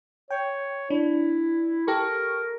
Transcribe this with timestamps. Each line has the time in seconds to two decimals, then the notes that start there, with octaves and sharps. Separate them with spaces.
0.30 C#5 G5
0.90 D4 E4
1.87 G4 A4 A#4 C#6